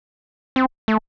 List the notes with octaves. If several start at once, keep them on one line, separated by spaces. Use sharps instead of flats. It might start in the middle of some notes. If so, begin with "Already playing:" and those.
C4
A3